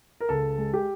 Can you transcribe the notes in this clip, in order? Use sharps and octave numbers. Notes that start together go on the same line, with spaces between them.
A#4
C#2 A4
G#3
G4